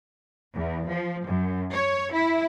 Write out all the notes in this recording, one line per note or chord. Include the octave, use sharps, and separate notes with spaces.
E2
F3
F#2
C#5
E4